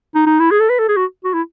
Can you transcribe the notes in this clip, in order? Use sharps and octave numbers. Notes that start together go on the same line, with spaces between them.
D#4
D#4
E4
G#4
A4
B4
A4
G#4
F#4
F#4
E4